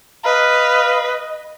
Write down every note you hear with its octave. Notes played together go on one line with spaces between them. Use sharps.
B4 D#5 F5